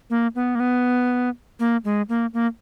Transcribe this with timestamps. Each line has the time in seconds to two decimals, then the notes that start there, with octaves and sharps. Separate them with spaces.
0.10 A#3
0.35 B3
0.55 A#3
0.60 B3
1.60 A#3
1.85 G#3
2.09 A#3
2.34 A#3